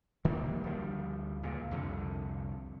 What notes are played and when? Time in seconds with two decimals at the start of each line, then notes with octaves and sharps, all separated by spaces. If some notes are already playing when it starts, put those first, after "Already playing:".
0.25 D#3 E3 G3 A#3
0.64 D2 F3 G3
1.43 C#2 A#2
1.71 C2 F2 D3